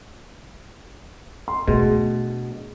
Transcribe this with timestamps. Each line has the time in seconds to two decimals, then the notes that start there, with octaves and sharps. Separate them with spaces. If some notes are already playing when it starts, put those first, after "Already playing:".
1.48 C6
1.68 B2 A3 D4 G#4